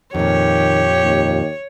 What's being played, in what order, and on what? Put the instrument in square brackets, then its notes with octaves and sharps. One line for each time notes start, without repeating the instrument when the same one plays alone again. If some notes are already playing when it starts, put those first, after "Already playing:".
[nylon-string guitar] F2 A#2 [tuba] D#3 [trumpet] G4 [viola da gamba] C#5
[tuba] D#2